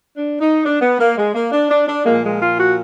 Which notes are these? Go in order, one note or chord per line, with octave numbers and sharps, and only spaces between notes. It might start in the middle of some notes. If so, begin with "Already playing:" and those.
D4
D#4
D4
B3
A#3
G#3
A#3
D4
D4
D4
A#2 F3 G#3 A#3
G#3
F4
F#4